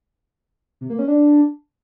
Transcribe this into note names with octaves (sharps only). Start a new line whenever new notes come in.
C3
A#3
C#4
D4